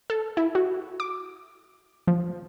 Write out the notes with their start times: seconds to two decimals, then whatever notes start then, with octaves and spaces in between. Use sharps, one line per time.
0.10 A4
0.37 E4
0.55 F#4
1.00 D6
2.07 F3